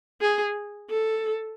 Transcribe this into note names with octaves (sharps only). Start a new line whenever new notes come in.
G#4
A4